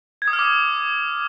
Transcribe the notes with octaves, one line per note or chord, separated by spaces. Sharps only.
G#6
D#6
F6
D6